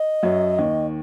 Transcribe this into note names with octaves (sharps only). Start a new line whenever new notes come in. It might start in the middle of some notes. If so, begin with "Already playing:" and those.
Already playing: D#5
F#2 F#3
D#2 D#3